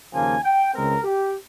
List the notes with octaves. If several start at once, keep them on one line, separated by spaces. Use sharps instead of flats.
D#2 C#3 F3 A#3 G#5
G5
C#2 C#3 G#3 C4 A#4
G4